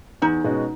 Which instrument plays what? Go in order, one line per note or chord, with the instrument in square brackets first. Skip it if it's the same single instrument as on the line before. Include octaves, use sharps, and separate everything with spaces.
[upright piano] E2 [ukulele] D#4
[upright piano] B2 G#3 C#4 F#4